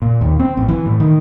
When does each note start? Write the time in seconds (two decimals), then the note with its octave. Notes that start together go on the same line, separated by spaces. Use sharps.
0.02 A#2
0.21 D#2
0.39 C4
0.57 A1
0.68 E3
0.86 A2
1.00 D#3